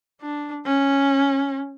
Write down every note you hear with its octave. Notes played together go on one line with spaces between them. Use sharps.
D4
C#4